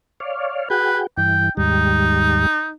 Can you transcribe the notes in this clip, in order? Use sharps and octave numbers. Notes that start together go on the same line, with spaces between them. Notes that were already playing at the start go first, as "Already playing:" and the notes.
C#5 D5 F5
F#4 G#4 B4 G5
G2 E3 G5
D#2 G#2 G3 D#4